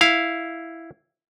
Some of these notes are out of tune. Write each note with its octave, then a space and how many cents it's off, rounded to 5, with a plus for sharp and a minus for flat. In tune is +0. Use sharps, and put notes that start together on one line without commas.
E4 +0 F5 +0